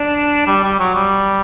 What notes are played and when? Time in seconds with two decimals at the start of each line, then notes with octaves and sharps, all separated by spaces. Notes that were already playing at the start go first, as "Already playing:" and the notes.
Already playing: D4
0.47 G3
0.64 G3
0.79 F#3
0.95 G3